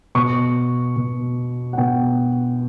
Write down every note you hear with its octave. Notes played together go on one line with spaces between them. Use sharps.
B2 C#6
B2
F#5
B2 G5